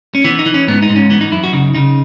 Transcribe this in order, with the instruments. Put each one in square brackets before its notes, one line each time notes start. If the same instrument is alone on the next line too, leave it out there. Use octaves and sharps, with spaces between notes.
[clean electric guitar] C#4
E3 B3
D#4
E3
C#4
G#2 B3
D#4
G#2
C#4
E3 B3
D#4
F#2 E4
F#4
C#3 D#4
C#3 D#4